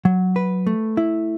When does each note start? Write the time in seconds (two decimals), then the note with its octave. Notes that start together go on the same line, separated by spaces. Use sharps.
0.05 F#3
0.36 B4
0.67 A3
0.97 E4